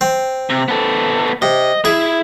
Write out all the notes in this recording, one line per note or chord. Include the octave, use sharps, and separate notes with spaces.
C4
C3
B3 A4
C3 D#5
E4 G#4